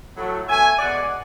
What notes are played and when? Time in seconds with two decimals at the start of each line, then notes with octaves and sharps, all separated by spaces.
0.17 A2 F#3 A3
0.47 B2 A3 E5 G#5
0.78 B2 G#3 D5 F#5